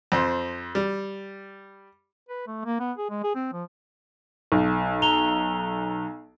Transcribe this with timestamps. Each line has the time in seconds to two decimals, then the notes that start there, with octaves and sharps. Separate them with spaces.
0.12 F2 C5
0.75 G3
2.29 B4
2.47 A3
2.65 A#3
2.80 B3
2.98 G#4
3.10 G#3
3.23 G#4
3.35 C4
3.53 F3
4.52 B1
5.02 A#5 F7 G7